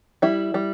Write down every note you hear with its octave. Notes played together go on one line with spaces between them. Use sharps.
G3 E4
G3